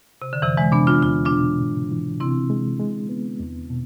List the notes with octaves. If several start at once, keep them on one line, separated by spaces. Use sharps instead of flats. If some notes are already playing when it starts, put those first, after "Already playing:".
C3
D3
F2 C3 E3
E3 G#3
C3 B3 D4
D4 F4
E2 F4
D4 F4
B2
G#2
E3
C3 C4 E4
G#3
G#3
B3
E2
B2